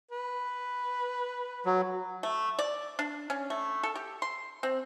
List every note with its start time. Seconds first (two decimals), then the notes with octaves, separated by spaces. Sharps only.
0.11 B4
1.66 F#3
2.23 A3
2.59 D5
2.99 D4
3.30 C#4
3.50 A3
3.83 A4
3.96 G4
4.22 C6
4.63 C4